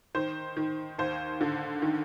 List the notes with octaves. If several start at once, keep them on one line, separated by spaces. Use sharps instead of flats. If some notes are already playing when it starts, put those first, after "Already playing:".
D#3 C5
D#3
D#2 C5
D3
D#3